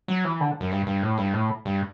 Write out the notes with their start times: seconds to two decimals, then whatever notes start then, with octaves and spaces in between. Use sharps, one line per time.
0.08 F#3
0.25 E3
0.40 D3
0.60 F#2
0.72 G2
0.86 G2
1.02 A2
1.18 G2
1.33 A2
1.65 G2